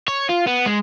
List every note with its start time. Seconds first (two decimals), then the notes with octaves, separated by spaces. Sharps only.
0.08 C#5
0.29 F4
0.48 B3
0.66 G#3